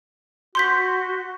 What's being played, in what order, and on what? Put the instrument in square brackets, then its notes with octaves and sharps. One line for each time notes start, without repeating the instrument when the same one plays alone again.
[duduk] F#4 [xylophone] C6 G6 B6